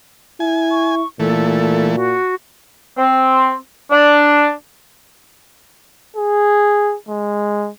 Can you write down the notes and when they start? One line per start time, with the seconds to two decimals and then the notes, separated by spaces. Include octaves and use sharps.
0.40 E4 G#5
0.71 C#6
1.20 A#2 E3 A3 A4
1.95 F#4
2.97 C4
3.90 D4
6.16 G#4
7.09 G#3